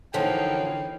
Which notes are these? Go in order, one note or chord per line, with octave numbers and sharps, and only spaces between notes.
F#2 D3 E3 F3 A#3 D#4 C#5 G5